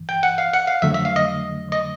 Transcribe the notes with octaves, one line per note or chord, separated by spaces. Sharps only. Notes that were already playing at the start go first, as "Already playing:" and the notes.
Already playing: G2 E3
G5
F#5
F5
F#5
F5
F2 D3 F#3 A3 E5
E5
F5
D#5
D#5